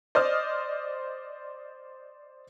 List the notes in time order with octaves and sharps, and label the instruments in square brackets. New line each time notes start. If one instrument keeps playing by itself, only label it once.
[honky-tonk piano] C5 D5 D#5 D#6 F6